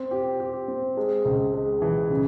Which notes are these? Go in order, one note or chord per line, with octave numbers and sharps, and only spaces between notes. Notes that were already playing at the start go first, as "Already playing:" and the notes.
Already playing: C4
G4
G4
C4
G#3
C#2
G#3
E3
C#3